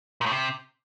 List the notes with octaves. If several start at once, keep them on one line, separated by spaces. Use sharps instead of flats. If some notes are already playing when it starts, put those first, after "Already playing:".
A#2
A2
C3